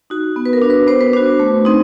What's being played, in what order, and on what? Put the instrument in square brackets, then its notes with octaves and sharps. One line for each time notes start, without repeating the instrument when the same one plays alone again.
[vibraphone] D#4 F#4
B3
B4
A#4
D4 F#4
B4
B3 C5
B4
D4 F#4 C5
A3
C4 D#4